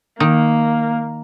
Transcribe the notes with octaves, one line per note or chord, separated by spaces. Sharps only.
D#3 A#3